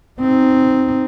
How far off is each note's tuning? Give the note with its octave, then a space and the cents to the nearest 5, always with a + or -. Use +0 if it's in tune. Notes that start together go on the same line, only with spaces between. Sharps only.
C4 -5 D#4 +0